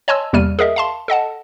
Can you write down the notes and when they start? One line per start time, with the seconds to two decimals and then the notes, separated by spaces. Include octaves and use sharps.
0.08 C#5 D#5 G#5 A5 C6 E6
0.33 E2 C3 G3 A#3 F6 D#7
0.59 G#4 A#4 D#5 E5
0.76 F5 A5 C6
1.08 A4 D#5 F#5 A5